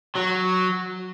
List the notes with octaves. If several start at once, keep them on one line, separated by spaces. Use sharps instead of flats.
F#3